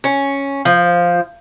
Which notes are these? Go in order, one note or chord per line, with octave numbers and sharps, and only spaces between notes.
C#4
F3